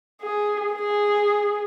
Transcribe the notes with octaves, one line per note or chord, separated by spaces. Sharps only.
G#4
G#4